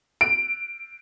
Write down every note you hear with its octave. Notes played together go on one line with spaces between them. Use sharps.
D7